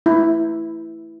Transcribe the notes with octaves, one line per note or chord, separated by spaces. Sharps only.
E4